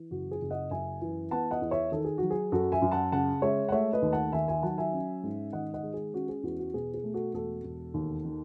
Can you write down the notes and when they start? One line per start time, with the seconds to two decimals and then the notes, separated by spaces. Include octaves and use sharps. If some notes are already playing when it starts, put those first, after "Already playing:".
Already playing: E3
0.11 F#1 F#4
0.31 G#4
0.41 F#1
0.51 D#5 F#5
0.71 F#2 E5 G#5
1.01 E3
1.31 B3 F#5 A5
1.51 D#5 F#5
1.61 E2
1.71 C#5 E5
1.92 D#3 A4
2.05 G#4
2.18 F#3 F#4
2.30 G#4
2.52 F#2 F#4 A4
2.72 E5 G#5
2.82 F#2
2.92 F#5 A5
3.12 C#3 F#5 A5
3.42 G#3 C#5 E5
3.69 F#5
3.72 A3 C#5 E5
3.93 B4 D#5
4.02 D#2
4.12 F#5 A5
4.32 D#3 E5 G#5
4.48 E5 G#5
4.62 F#3 F#5 A5
4.78 E5 G#5
4.92 C#4
5.23 G#2
5.53 D#3 D#5 F#5
5.74 D#5 F#5
5.83 G#3
5.94 G#4
6.13 C#4 F#4
6.29 G#4
6.43 E2 F#4
6.59 F#4
6.74 B2 G#4
6.94 G#4
7.04 A3
7.14 F#4 A4
7.34 E1 F#4 A4
7.64 E1
7.94 D#2
8.25 D#3